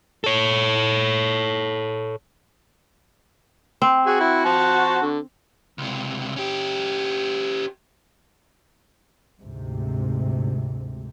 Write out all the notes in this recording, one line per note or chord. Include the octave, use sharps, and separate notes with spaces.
A4 C#5
C4
F#4 G#4
E4
C5 A5
D3
C#2 C3
C#4 G4
D2 G#2 C3